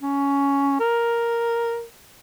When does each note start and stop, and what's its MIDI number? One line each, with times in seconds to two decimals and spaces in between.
0.02 0.78 61
0.80 1.84 70